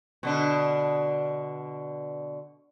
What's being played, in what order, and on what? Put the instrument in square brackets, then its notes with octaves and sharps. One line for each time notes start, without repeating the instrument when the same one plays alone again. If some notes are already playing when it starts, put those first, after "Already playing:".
[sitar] B2 D3 D4